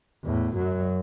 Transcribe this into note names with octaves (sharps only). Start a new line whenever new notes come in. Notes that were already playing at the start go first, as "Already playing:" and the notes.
E2 A2
F#2 F#3